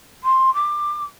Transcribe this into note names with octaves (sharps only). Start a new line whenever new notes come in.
C6
D6